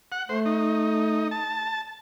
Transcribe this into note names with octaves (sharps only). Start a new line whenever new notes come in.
F#5
A3 C5
D#4
A5